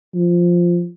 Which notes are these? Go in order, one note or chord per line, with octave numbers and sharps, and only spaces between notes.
F3